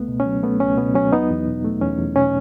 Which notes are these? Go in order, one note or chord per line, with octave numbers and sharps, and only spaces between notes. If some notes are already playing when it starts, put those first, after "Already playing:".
Already playing: C#2 A3 B3
B2
C#4
F#3
A3 B3
C#2 C#4
B2 B3
F#3 C#4
E2 B3 D#4
E2
B2
A3
E2 C#4
E2
B2 C#4